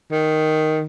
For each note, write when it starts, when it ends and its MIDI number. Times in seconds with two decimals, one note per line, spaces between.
0.12 0.86 51